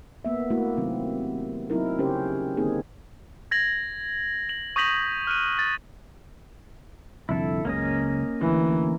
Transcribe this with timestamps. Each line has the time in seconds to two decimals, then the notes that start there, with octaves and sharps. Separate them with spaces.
0.25 A#3 B3 E5
0.50 A3 A#3 E4 F#4
0.77 C3 D#3 F#3 C4
1.70 F#3 C4 D#4 E4 A#4
1.98 C#3 C#4 G4 A#4 C5
2.57 D3 D#3 A#3 C4 D#4 G#4
3.51 G#6 A#6 F#7
4.49 F#7
4.76 C#6 D#6 G6 A#6 B6 F#7
5.27 F6 F#6 D#7
5.59 A6
7.29 C2 F2 D3 E4 A4
7.65 C#2 F#2 C#3 A#3 C#4 D#5
8.41 D2 E3